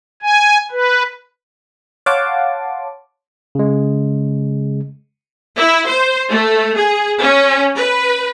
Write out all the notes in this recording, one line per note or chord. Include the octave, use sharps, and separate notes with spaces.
G#5
B4
C#5 F5 F#5 A5 C6 D6
C#3 G#3
E4
C5
A3
G#4
C#4
B4